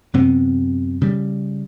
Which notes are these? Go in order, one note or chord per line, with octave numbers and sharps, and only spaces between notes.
F#2 C3 B3 C4
C#3 G3